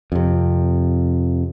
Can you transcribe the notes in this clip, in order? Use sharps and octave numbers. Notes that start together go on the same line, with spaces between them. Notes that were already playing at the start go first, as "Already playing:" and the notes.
F2 C3